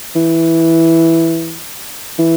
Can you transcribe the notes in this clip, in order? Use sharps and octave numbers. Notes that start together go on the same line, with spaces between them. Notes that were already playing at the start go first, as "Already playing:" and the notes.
E3
E3